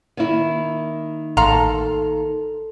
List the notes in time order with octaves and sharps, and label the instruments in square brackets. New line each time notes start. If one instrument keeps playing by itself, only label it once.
[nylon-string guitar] D#3 A#3 E4
[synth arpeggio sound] A1 F5 C6 [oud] A4 [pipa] A#5